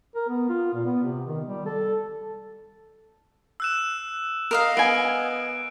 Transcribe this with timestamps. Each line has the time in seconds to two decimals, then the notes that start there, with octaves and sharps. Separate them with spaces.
0.15 A#4
0.29 B3
0.49 F4
0.74 A#2
0.85 B3
1.04 C3
1.27 D#3
1.46 G3
1.66 A4
3.60 E6 F#6 E7
4.51 A#4 D#5 F5
4.77 B3 G#5 D7